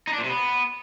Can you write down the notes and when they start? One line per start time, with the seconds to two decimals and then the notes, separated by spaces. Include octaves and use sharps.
0.07 D#4
0.13 D4
0.18 A#2
0.24 C3
0.29 B3